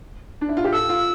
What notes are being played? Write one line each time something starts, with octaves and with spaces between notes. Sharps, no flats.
D4
E4
F4
G4
A4 E6
F4